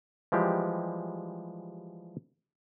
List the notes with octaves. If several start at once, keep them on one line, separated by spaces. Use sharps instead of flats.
E3 F3 G3 G#3 G4